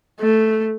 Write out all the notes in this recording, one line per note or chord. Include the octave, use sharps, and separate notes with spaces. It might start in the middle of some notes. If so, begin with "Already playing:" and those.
A3